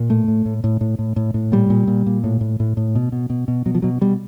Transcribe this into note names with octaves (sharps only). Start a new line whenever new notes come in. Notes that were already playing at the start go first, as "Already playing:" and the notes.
Already playing: A#2
A2 A3
A2
A2
A2
A2
A2
A2
A2
A#2 G3
A#2
A#2
A#2
A2
A2
A2
A2
B2
B2
B2
B2
B2 F#3
F3
B2 F#3
B2 G3